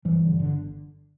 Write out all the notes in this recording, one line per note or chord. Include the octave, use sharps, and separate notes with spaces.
G1 E3 G3
G2 D3
G1 D3